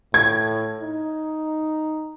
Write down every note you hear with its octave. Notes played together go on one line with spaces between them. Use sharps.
A2 G#6
D#4